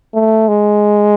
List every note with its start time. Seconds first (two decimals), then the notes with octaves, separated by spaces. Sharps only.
0.14 A3
0.48 G#3